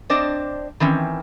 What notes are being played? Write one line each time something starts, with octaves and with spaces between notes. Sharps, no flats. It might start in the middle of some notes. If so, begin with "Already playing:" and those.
C4 D4 C5 D5 D#5
D#3 E3 C4 C#4